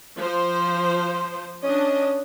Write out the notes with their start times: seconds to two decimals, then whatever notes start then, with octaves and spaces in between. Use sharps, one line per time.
0.17 F3 C5
1.63 C#4 D4 D#5